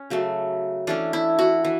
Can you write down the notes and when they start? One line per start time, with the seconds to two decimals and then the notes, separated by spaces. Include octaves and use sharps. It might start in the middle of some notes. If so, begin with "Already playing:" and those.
Already playing: C#4
0.10 C#3 F#3 A3
0.87 E3 A3 C#4 D4
1.13 E4
1.39 F#4
1.65 E3